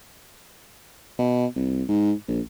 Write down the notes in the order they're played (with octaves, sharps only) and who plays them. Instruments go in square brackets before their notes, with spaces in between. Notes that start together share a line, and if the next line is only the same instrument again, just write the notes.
[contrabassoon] B2
C2
G#2
A#1